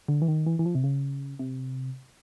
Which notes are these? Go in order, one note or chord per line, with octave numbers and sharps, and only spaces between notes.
D3
E3
D#3
E3
E3
F3
C3
C#3
C3